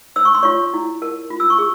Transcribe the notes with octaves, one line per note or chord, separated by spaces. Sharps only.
C5 E6
C#6
C6
F4 C#5 C#6
E4
A#4
F4
E6
C#6
G#4